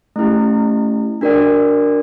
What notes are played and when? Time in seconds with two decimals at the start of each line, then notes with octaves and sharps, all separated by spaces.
0.16 A3 C#4 E4 G4
1.21 D4 F#4 A#4 D5 G5